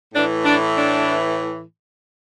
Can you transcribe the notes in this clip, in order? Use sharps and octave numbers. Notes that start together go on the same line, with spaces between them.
A2 E3 D4
D4
D4